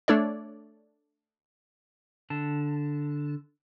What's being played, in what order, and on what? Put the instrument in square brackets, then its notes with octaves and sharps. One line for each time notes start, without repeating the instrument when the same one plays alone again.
[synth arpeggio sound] A3 D4 A4 C#5 D5
[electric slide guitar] D3 A5